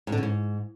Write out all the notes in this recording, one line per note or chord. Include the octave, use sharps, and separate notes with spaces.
G#2
D3
C#3
G#2